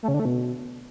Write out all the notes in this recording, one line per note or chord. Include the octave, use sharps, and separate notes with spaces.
A3
C#3
D3
A3
B2